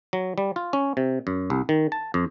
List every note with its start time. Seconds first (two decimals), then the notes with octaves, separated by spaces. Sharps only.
0.13 F#3
0.38 G3
0.56 F4
0.73 C#4
0.97 C3
1.27 F#2
1.50 C2
1.69 D#3
1.92 A5
2.14 F2